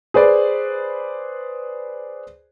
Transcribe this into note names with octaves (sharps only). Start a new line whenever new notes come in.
G#4 B4 C5 D5